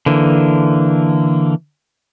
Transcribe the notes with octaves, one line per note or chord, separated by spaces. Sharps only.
D3 E3 A#3